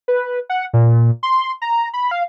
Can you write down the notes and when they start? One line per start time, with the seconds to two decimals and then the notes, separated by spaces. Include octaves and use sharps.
0.08 B4
0.50 F#5
0.74 A#2
1.23 C6
1.62 A#5
1.94 B5
2.11 F5